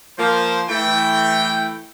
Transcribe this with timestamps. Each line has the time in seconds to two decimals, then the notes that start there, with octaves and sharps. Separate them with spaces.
0.18 F3 A#3 C5
0.69 E3 A3 G5